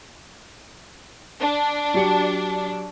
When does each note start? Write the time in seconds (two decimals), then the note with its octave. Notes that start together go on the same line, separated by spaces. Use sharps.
1.40 D4
1.94 F#3 G4 C#7